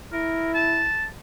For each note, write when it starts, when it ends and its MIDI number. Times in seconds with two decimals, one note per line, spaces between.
0.13 0.89 64
0.13 0.54 70
0.54 1.08 81